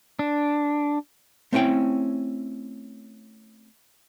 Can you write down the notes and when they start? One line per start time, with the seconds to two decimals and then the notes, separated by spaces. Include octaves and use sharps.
0.19 D4
1.53 A3 C4 C#4 E4 G5